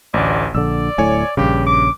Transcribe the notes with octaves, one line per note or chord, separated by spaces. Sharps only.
A1 D2 D5
A#1 D3 D5 E6
D1 A2 C#5 G#5
A#1 G2 C#3 G4
D6